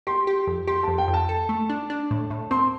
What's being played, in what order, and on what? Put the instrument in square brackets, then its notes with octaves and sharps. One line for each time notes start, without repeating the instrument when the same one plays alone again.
[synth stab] G4 [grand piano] C6
[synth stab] G4
F2
[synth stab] G4 [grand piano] C6
[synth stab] F2 [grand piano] A5
[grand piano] G5
[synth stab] F2
[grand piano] A5
[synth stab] A4
A3
D4
D4
A2
A2
[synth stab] C4 [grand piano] C6